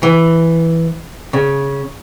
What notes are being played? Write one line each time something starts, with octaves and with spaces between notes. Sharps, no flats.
E3
C#3